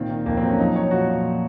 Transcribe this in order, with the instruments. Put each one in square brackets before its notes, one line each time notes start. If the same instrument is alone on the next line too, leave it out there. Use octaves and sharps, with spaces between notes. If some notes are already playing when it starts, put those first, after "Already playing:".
Already playing: [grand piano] A#2 D#3 C4
D#3
F2 A#3
C4
F#3
C#4
F3 D#4
F3 C#5
A#2 F#4
F3